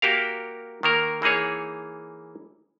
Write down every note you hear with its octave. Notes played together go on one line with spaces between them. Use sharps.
A#3 F#4 G4 A#4 F5
D#3 A#3 A#4
E3 A#3 D#4 G#4 C#5